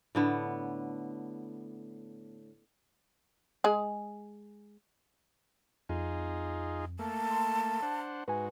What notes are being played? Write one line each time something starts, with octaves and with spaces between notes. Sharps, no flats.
A2 D3 B3
G#3 G#4
F2 D#4 F4 G#4
A3 A#3 A5
C6
D4 C5 F#5
G#2 F#4 B4 G#5